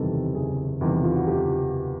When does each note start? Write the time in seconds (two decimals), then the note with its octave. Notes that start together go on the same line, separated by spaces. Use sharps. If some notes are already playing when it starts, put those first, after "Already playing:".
Already playing: F#1 E2 C3 D#3 G3 A4
0.35 F#1 G#4
0.81 E2 C3 D#3 G3
1.03 F4
1.15 F#4
1.27 F#1 G4